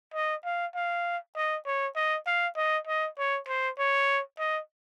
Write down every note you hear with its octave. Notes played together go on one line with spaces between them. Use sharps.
D#5
F5
F5
D#5
C#5
D#5
F5
D#5
D#5
C#5
C5
C#5
D#5